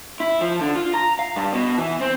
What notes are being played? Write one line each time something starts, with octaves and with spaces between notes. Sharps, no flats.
E4
F3
D3
F4
A#5
F5
G2
B2
E3
C4